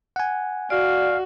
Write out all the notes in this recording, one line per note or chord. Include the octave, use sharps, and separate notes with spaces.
F#5 G#5
F#4 D5 F5